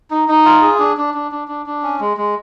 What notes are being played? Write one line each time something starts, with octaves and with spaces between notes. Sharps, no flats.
D#4
D#4
F4
G#4
D4
D4
D4
D4
D4
D4
C#4
G#3
G#3